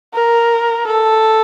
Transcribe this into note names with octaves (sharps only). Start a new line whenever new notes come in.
A#4
A4